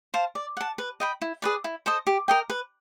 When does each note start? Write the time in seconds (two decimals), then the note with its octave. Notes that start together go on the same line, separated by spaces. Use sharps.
0.14 C5 F5 A5
0.35 D5
0.57 F#5 A5
0.78 B4
1.00 D#5 G5 B5
1.22 E4
1.42 G#4 B4 D5
1.64 E4
1.86 A4 C5 D#5
2.07 G4
2.28 A#4 D#5 G5
2.50 B4